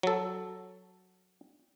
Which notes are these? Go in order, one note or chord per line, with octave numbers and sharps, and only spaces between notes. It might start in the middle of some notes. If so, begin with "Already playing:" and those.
F#3 A4